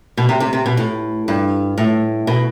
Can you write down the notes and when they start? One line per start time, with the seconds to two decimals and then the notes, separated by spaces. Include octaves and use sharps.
0.17 B2
0.29 C3
0.40 C3
0.53 C3
0.66 B2
0.77 A2
1.28 G2
1.78 A2
2.27 B2